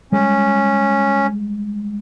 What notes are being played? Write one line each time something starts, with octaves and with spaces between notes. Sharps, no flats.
G3 G#3 C#4